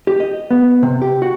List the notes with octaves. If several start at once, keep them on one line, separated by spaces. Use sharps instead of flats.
G4
D#5
B3
C3
G4
F#4